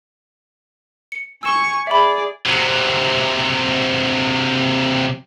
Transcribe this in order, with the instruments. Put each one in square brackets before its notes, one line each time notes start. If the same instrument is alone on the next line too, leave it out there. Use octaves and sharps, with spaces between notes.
[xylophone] C#7
[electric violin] G#5 C#6 [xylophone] E6 E7 G7
[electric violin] G#4 D5 [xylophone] E5 B5
[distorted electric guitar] C3 F#3